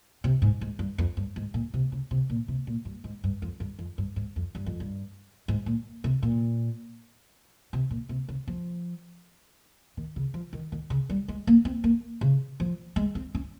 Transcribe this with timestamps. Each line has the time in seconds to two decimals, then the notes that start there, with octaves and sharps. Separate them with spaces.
0.24 C3
0.42 G#2
0.61 G#2
0.79 G2
0.98 F2
1.17 G2
1.36 G#2
1.54 A#2
1.74 C3
1.92 C#3
2.11 C3
2.30 A#2
2.48 C3
2.67 A#2
2.85 G2
3.04 G#2
3.24 G2
3.42 F2
3.60 G2
3.79 F2
3.98 G2
4.16 G#2
4.36 F2
4.55 G2
4.66 F2
4.80 G2
5.48 G#2
5.66 A#2
6.04 C3
6.23 A#2
7.73 C3
7.91 A#2
8.09 C3
8.29 C#3
8.47 F3
9.97 D#3
10.16 C#3
10.34 F3
10.53 D#3
10.72 D#3
10.90 C#3
11.10 G3
11.28 G#3
11.47 A#3
11.65 C4
11.84 A#3
12.21 C#3
12.60 F3
12.96 G#3
13.15 C4
13.35 C#4